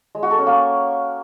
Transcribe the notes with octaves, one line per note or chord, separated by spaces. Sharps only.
G#3
F#4
A4
C#4
A#3